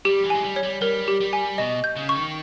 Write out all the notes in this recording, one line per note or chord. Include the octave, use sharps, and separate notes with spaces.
G3 G4
E3
G#3 G#5
G3
C#5
G3
G3 A#4
G4
G3
G#5
B2 D#5
G6
C#3
C#6
D#3